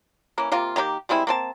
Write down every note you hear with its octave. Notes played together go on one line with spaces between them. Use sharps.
E3 A#3 C#4
C3 A#3 F4
D#3 A#3 E4 G4
G3 G#3 C4 E4
A#3 C4 A5